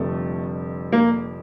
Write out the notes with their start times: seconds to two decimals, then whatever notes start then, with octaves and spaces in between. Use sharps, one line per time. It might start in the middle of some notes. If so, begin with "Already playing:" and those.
Already playing: F1 F2 D3 G3 A3
0.92 A#3